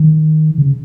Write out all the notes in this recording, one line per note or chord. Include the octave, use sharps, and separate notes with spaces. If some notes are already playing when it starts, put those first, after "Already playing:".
Already playing: D#3
C#3